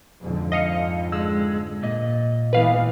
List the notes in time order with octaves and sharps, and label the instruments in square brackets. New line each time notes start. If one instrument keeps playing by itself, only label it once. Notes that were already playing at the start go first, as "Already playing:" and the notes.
[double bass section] F2 G#2 D3
[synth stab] D#5 F5 C#7
[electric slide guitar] G#3 [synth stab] E6
[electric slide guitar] A#2 D#5
[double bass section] G#1 E3 B3 [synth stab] B4 F5